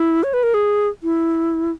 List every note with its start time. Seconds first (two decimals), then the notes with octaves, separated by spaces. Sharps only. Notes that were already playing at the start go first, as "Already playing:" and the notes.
Already playing: E4
0.23 C#5
0.34 B4
0.43 A#4
0.54 G#4
1.03 E4